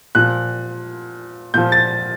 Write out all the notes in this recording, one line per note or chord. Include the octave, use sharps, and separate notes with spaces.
A#2 F3 F#6
A#2 F3 G6
A6